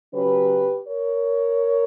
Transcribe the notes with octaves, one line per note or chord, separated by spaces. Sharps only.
C#3 F#3 C#4 G4 B4
A#4 C#5